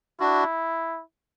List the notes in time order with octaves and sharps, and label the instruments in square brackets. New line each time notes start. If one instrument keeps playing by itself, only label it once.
[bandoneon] D4 F#4 [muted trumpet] E4